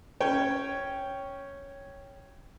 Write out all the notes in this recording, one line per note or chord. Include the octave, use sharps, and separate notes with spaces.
C#4 C#5 G5